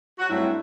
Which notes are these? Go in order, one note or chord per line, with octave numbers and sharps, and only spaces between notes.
F#4
G2 F#3 A3 C4 E4